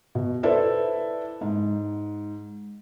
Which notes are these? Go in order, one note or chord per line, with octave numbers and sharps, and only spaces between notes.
B2
E4 A4 B4 C5 D5 E5
G#2